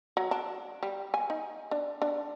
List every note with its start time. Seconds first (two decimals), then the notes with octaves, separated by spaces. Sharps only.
0.17 F#3
0.31 D4
0.83 G3
1.14 G#5
1.30 D#4
1.71 D4
2.02 D4